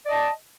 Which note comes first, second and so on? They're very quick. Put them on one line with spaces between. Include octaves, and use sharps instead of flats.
D5 D#5 A5